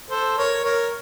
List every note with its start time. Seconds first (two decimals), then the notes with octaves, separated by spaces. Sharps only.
0.10 A4 C5
0.38 A#4 C#5
0.64 A#4 C#5